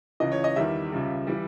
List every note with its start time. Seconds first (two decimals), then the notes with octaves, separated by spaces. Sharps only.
0.20 C#2 C#3 E3 D#5
0.32 C#5
0.44 D#5
0.56 E2 D#3 G3 E5
0.92 C#2 C#3 G3
1.27 E3 G3